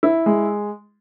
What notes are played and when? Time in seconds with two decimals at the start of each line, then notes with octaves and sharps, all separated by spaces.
0.03 E4
0.26 G#3